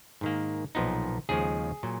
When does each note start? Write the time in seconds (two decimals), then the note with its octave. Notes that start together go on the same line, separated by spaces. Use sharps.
0.21 G#2 D#3 A#3
0.75 B1 A#2 F3 B3 D#4
1.29 D#2 C#3 F3 G#3 G#4
1.83 A#2 F#3